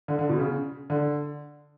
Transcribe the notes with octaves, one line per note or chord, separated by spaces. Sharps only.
D3
D3
B2
C#3
D3